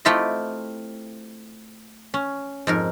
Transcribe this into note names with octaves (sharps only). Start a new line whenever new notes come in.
A3 C4 E4 F4 G4 D#5
C#4
F2 G#2 A#4